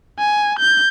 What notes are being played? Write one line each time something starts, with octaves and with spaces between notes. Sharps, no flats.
G#5
G6